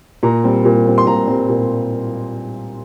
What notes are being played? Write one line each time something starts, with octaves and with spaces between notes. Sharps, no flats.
A#2 A#5
G3 C4
A#2
G3 C4
C6
A#2 A#5
G3 C4
A#2